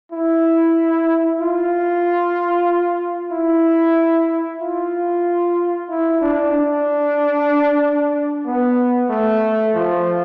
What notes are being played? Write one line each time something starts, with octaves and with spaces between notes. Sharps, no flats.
E4
F4
E4
F4
E4
D4
D4
B3
A3
F3